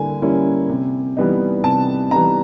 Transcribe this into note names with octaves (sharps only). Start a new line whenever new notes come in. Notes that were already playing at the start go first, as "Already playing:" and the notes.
Already playing: D3 G3 A#3 E4 G#5
G3 A#3 C#4 E4
C3
E3 G3 B3 D#4
C3 A5
E3 G3 B3 D#4 A#5